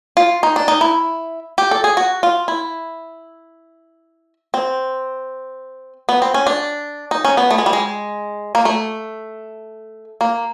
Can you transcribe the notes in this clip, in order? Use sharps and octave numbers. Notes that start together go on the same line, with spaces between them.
F4
D#4
D4
D#4
E4
G4
A4
G#4
F#4
F4
E4
C4
B3
C4
C#4
D4
D#4
C#4
B3
A3
G#3
G3
G#3
A#3
A3
A#3